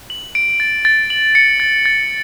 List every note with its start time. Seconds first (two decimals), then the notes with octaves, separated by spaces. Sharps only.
0.10 F#7
0.35 D7
0.60 A6
0.85 A6
1.10 F#7
1.35 C#7
1.60 A6
1.85 A6